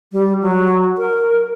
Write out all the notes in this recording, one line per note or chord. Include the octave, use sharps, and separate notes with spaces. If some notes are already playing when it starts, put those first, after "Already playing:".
G3
F#3
A#4